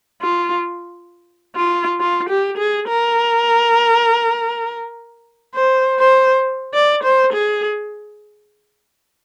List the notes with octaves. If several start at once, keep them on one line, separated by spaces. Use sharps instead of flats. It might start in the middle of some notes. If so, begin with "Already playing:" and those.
F4
F4
F4
G4
G#4
A#4
C5
C5
D5
C5
G#4